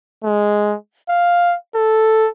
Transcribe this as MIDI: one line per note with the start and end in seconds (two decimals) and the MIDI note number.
0.24 0.76 56
1.09 1.55 77
1.75 2.29 69